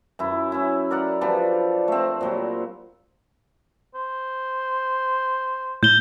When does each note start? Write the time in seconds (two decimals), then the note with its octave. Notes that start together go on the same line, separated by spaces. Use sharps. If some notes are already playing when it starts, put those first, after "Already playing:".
0.19 F#2 E4
0.52 C#4 E4
0.91 A#4 D5 F#5
1.21 F3 G3 B3 D4
1.88 A3 C4
2.21 A#2 F#3 G3
3.94 C5
5.83 A2 G6 G7